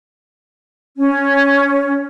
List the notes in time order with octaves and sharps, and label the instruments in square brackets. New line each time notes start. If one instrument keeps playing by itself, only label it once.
[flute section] C#4